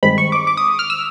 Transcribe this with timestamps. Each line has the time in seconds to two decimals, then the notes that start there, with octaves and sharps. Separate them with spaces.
0.03 G2 D#3 G#3 C4 B5
0.18 C#6
0.32 D6
0.47 D6
0.57 D#6
0.79 F6
0.90 E6